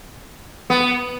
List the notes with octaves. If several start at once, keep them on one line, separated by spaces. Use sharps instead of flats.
B3